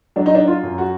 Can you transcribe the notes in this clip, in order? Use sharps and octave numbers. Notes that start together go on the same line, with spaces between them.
F#3 D4
D#4
D4
F4
F#2
F#4